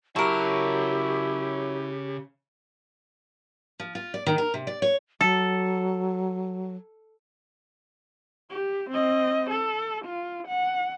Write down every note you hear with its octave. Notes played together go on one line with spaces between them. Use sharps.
C#3 F#3 E4 G4 A#4 A5
F3
F4
D5
D#3
A#4
C3
D5
C#5
F#3 A4
G4
C4 D#5
A4
F4
F#5